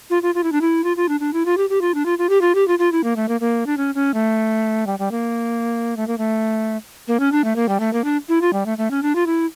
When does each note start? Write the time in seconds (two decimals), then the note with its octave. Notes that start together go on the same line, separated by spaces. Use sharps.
0.10 F4
0.23 F4
0.35 F4
0.44 E4
0.52 D4
0.61 E4
0.84 F4
0.97 F4
1.09 D4
1.20 D4
1.33 E4
1.46 F4
1.57 G4
1.70 G4
1.81 F4
1.94 D4
2.06 F4
2.18 F4
2.29 G4
2.41 F4
2.55 G4
2.68 F4
2.79 F4
2.92 E4
3.04 A#3
3.16 A3
3.29 A#3
3.41 A#3
3.66 D4
3.77 C#4
3.95 C#4
4.14 A3
4.87 G3
4.99 G3
5.11 A#3
5.97 A3
6.08 A#3
6.18 A3
7.08 A#3
7.20 C#4
7.32 D4
7.44 A3
7.56 A#3
7.69 G3
7.80 A3
7.93 A#3
8.04 D4
8.29 E4
8.42 F4
8.53 G3
8.66 A3
8.78 A3
8.91 C#4
9.03 D4
9.15 F4
9.26 E4